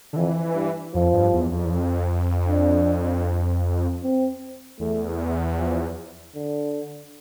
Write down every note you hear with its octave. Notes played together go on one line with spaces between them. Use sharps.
D3
F2 E3
G2
F2 F3
G2
E2
F2
E2
F2
D4
C4
E2 A3
F3
D3